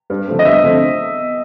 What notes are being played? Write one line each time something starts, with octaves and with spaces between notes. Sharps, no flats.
G2
D3 F3 A3 C4
D#5
G2 E5
D3 F3 A3 C4